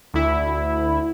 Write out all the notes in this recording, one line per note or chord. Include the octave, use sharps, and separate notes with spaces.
D2 E4